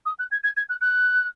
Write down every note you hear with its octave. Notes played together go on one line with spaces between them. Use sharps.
D#6
F#6
G#6
G#6
G#6
F#6
F#6